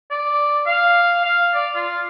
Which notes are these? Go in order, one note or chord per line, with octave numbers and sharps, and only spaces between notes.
D5
F5
F5
D5
F4